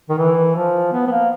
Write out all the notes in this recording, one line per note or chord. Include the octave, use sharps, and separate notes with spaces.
D#3
E3
F3
B3
B3
A#3